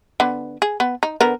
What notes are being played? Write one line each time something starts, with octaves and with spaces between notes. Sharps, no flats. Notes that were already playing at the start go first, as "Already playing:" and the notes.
D3 B3
G#4
B3
D#4
D3 B3 A#4